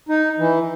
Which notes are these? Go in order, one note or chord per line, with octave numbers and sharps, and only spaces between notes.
D#4
E3